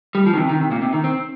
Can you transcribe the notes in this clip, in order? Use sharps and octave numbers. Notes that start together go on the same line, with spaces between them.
G3
F3
D#3
C3
D#3
C3
A#2
C3
D#3
C4